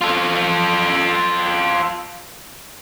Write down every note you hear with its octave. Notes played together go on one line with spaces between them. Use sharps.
F4 A4